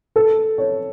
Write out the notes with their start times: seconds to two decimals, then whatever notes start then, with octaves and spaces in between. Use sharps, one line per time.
0.16 A4
0.58 C#5